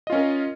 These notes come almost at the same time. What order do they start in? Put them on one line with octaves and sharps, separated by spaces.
D#5 F4 C#4 A#4